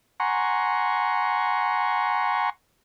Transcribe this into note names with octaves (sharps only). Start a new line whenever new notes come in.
F#5 G#5 A#5 C6 C#6